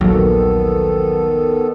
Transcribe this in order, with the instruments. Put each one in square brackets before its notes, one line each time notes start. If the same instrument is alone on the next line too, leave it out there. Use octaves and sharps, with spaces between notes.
[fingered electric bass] A#1 D#2 [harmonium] D#3 B3 A4 [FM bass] F#3